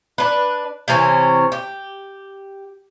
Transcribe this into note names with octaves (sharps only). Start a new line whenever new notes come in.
D4 B4
C3 E3 C4 C#4
G4